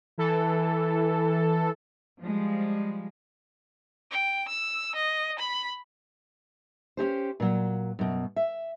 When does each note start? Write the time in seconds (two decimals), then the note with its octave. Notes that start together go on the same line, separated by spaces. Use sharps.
0.18 E3 A4
2.21 F3 G3 G#3
4.11 G5
4.48 E6
4.95 D#5
5.39 B5
6.97 C#4 D#4 G4 C5
7.40 A#2 F#3
7.99 F#2 B2
8.36 E5